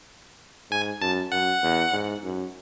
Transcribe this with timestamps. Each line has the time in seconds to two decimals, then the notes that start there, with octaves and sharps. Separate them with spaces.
0.71 G#2 G#5
1.01 F#2 A5
1.32 F#2 F#5
1.62 E2
1.93 G#2
2.23 F#2